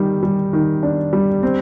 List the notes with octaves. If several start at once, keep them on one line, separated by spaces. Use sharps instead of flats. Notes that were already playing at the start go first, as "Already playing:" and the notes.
Already playing: D#3 G3
G3
D#3
D4
G3
C4